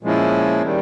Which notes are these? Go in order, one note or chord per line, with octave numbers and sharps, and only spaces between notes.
A#2 F3 G#3 C#4 E4
D#3 G3